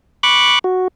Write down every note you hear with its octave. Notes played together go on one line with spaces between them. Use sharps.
B5 C#6 D6 F#6
F#4